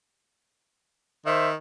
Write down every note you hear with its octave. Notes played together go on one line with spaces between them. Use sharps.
D#3 C5 E5